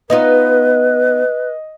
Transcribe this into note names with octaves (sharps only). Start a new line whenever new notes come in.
B3 D#4 F4 B4 D#5